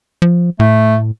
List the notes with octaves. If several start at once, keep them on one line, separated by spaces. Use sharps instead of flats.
F3
A2 A3